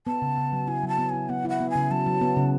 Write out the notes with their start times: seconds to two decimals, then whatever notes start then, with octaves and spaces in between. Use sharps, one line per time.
0.07 B3 A5
0.22 C#3
0.38 C#3
0.53 F#3
0.68 E4 G#5
0.83 F#3
0.88 A5
0.99 B3
1.09 E4 G#5
1.29 B3 F#5
1.45 E4 F#5
1.60 B3
1.70 G#5
1.76 C#3
1.91 F#3 A5
2.06 F#3
2.21 B3
2.37 C#3